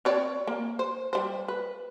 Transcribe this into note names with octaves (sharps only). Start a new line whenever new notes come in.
C4 C#5 D5
A#3
C5
G3 C5
B4